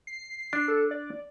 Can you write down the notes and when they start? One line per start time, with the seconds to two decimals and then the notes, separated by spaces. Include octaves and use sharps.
0.07 C7
0.53 D4
0.68 A4
0.91 D5